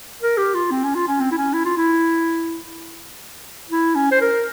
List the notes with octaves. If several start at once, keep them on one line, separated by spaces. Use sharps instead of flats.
A#4
G4
F4
C4
C#4
F4
C#4
C4
E4
C#4
E4
F4
E4
E4
C#4
C5
A#4